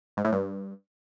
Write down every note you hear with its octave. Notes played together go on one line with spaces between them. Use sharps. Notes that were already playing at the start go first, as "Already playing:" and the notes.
G#2
A2
G2